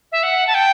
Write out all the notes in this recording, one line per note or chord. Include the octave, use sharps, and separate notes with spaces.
E5
F#5
A5
G5